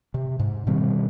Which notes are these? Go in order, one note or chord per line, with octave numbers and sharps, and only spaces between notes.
C3
G#2
B2 D#3 G3 C4